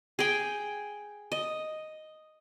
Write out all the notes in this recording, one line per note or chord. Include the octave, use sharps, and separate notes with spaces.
G#4 G5
D#5